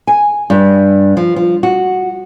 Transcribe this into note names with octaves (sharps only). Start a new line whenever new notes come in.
G#5
G2
F3
F3
F#4